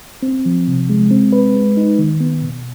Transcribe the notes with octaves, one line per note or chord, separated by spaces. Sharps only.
C4
F3
C3
G#3
C4
B4
G#3
D#4
D#3
B3
B2